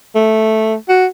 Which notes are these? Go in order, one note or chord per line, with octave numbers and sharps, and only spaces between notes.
A3
F#4